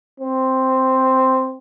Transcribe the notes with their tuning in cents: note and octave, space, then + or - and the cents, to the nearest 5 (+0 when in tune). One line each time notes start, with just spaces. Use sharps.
C4 +0